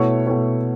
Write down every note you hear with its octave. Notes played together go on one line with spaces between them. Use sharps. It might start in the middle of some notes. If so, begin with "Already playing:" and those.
Already playing: B2 A3 E4 C#5
B2 A3 E4 C#5